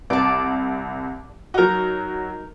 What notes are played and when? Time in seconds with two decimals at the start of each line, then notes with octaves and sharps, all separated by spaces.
0.10 C2 D5 A5
1.54 F#3 D#4 F#4 A#4